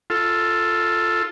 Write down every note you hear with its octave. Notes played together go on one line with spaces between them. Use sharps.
F4 A4